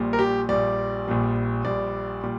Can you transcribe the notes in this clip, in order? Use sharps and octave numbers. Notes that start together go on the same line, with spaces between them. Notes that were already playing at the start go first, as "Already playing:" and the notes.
Already playing: A#1 A#2 G3
A#4
G4
A#1 A#2 G3 D5
A#1 A#2 G3
A#1 A#2 G3 D5
A#2 G3